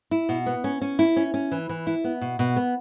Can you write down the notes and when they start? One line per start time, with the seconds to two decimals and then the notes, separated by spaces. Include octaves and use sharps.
0.11 E4
0.29 B2
0.46 B3
0.64 C#4
0.82 C#4
0.99 E4
1.16 C#4
1.34 C#4
1.52 E3
1.69 E3
1.87 E4
2.04 B3
2.21 B2
2.39 B2
2.56 B3